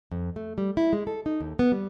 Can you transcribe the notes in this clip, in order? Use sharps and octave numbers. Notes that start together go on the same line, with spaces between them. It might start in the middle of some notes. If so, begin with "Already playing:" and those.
F2
A3
G3
E4
G#3
A4
D#4
D#2
B3
G3